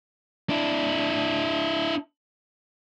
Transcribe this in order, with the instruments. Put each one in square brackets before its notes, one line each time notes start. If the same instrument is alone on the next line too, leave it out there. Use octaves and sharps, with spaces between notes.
[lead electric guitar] D4 E4